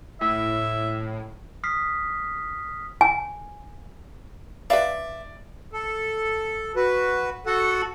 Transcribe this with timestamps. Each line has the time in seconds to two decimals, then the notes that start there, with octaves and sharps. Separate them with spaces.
0.21 A2 E5
1.64 D#6 F6 B6 C7
3.01 G#5
4.70 B4 D5 E5 F5
5.73 A4
6.76 F#4 B4
7.46 F#4 A4 F#5